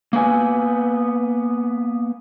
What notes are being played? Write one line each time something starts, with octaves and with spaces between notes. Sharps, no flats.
A#3 B3 G#5